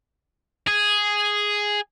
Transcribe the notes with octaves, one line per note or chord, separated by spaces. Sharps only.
G#4